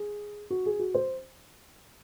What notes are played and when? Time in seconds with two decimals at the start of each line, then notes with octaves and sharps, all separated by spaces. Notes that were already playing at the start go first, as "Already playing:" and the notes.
Already playing: G#4
0.50 F#4
0.66 G#4
0.79 F#4
0.94 C5